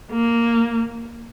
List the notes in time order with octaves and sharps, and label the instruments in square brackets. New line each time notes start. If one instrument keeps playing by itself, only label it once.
[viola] A#3